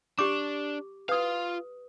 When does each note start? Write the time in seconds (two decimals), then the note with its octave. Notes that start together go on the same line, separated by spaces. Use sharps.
0.19 D4 G4 D6
1.09 F4 B4 F5 D#6